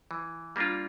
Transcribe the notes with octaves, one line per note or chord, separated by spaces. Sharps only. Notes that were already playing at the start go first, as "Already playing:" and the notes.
E3
G3 A#3 D4 F4